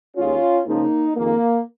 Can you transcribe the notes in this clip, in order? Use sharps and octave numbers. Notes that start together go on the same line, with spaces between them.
D#2 D#3 G#3 C#4 F4
C#2 C#3 F3 G#3 A#3 D#4
F2 D#3 G#3 A#3